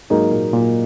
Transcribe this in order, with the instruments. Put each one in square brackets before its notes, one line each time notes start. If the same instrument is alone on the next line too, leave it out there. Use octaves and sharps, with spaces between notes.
[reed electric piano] G#2 [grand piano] F#3 A#3 D#4 G#4
[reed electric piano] A#2
A#2